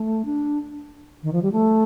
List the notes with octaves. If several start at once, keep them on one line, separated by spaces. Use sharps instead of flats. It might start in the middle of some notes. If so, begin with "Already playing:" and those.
Already playing: A3
D4
D#3
F3
G3
A3